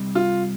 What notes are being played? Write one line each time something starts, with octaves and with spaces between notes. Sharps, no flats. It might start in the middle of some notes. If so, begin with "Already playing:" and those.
Already playing: C3 G3 C4 D#4
F4